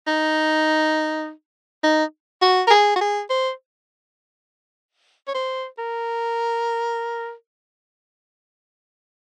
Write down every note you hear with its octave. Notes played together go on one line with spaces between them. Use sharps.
D#4
D#4
F#4
A#4
G#4
F#4
G#4
C5
C#5
C5
A#4